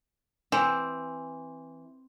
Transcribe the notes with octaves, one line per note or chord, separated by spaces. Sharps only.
E3 C4